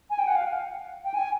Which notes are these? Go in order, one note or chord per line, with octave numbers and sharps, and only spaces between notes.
G#5
G5
F#5
F5
G5
G#5